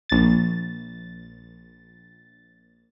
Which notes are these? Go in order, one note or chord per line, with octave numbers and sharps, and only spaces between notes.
A#1 A6